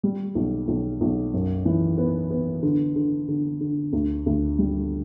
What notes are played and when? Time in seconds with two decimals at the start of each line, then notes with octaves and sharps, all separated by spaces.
0.03 G3
0.35 B1
0.68 B1
1.01 B1
1.34 F#2
1.65 E3
1.98 B3
2.31 B3
2.63 D3
2.96 D3
3.28 D3
3.60 D3
3.93 D2
4.26 D2
4.58 G3